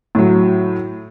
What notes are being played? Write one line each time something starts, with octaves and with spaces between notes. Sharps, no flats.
A2 F#3